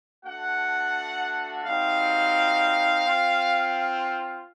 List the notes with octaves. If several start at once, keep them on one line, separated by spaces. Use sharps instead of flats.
A3 D4 F#4 F#5
G3 C4 D#4 F#4 F5
C4 F4